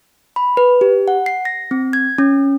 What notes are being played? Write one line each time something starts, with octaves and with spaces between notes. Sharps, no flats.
B5
B4
G4
F#5
C7
A#6
C4
G#6
C#4